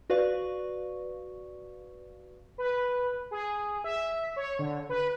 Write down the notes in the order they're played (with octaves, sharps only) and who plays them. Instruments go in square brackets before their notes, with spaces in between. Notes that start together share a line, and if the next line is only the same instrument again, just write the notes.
[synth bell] F#4 B4 D5 F5 C#6
[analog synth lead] B4
G#4
E5
C#5
D3
B4